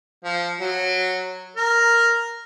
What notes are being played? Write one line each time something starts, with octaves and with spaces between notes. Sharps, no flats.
F3
F#3
A#4